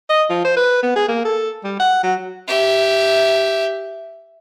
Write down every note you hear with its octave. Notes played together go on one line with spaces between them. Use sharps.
D#5
F3
C5
B4
B3
G#4
A#3
A4
G3
F#5
F#3
G4 E5